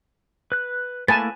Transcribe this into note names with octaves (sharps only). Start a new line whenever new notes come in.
B4 F#6
A3 A#3 E4 B4 G#5 A5 A6